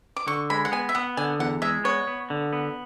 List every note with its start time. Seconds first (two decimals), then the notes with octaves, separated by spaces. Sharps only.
0.16 D6
0.27 D3 C#6
0.50 G#3 B5
0.65 F#5
0.72 B3 G#5
0.89 E5
0.95 B3 F#5
1.17 D3 G#5
1.39 E2 F#5
1.62 G#3 E5
1.84 B3 C#5
2.07 B3
2.30 D3
2.53 B3